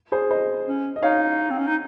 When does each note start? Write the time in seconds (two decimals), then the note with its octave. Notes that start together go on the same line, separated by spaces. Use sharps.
0.12 G#4 C5
0.31 C5 D#5
0.67 C#4
0.96 D#5
1.03 D#4 C#5 F5
1.50 C4
1.59 C#4
1.67 D#4